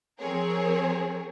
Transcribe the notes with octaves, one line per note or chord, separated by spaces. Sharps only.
F3 C4 G#4 A#4 C#5